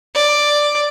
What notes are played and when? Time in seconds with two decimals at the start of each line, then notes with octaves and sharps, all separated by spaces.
0.15 D5